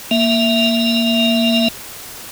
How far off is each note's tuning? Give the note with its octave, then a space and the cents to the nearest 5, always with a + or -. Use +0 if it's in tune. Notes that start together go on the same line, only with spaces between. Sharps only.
A#3 +0 E5 +5